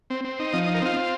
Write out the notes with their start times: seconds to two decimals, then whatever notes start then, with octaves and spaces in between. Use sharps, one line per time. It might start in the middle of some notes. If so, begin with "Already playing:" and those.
0.10 C4
0.25 C4
0.39 D#4
0.53 F3 D#5
0.64 D#5
0.67 D#4
0.74 A#4
0.82 C4 F4
0.96 C4